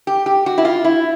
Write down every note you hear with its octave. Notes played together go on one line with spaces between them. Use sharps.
G4
G4
F#4
E4
F4
E4